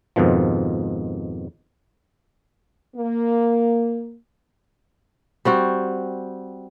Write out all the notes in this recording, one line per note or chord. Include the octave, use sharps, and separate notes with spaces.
F2 G#2 B2 D#3 F3
A#3
G3 C4 F#4